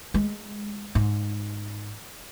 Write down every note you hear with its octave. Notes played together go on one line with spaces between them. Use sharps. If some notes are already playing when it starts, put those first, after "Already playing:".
G#3
G#2